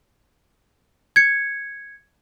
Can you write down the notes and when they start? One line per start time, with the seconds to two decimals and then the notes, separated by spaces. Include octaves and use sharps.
1.16 G#6 C#7